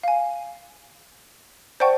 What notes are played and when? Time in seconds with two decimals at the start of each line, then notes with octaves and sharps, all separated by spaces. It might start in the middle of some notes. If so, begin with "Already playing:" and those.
0.03 F5 G#5
1.80 C5 D5 F#5 G5 A5 C#6